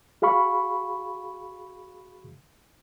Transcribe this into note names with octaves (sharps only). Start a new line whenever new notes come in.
F#4 G#4 F5 B5 C#6